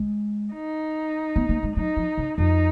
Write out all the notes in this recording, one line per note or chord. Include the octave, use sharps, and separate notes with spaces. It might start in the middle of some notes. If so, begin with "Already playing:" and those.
Already playing: G#3
D#4
B3
A#3
G#3
F#3 D#4
F3
C#3
F2 D#4